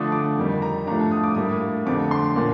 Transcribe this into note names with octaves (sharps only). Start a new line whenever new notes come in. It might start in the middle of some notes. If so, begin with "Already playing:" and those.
Already playing: D3 F3 A3 D4 D#6
D6
F2 D#3 G3
A#5
A2 F3 A3 D4 A#5
D#6
D6
A2 G3 A#3 D4 D#6
F2 D3 A3 C4 D6
C6
A#2 F3 A#3 D4